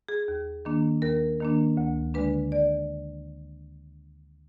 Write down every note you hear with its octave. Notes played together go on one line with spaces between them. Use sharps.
G#4
D#2
D#3 A#3 D4
D#2 A#4
D#3 A#3 D4
D2
D3 G#3 D4 B4
D5